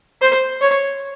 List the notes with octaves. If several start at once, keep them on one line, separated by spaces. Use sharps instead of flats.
C5
C#5